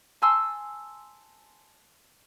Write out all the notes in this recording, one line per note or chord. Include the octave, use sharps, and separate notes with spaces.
G#5 A5 C6 E6